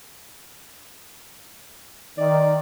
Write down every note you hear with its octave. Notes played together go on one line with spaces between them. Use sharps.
D#3 D5